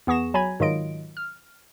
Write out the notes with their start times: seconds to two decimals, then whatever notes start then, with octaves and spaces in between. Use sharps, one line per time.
0.07 E2 B3 G#4 C#6 A#6 E7
0.34 F#3 G#5 A#5 B5 G#6
0.60 G#2 D#3 F#3 F4 D#5 D7
1.17 F6